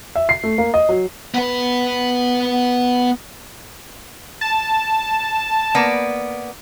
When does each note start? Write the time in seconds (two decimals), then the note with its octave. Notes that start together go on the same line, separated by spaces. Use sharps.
0.16 E5
0.29 C7
0.44 A3
0.58 A#3
0.74 D#5
0.89 F#3
1.34 B3 B4
4.41 A5
5.75 A#3 B3 D5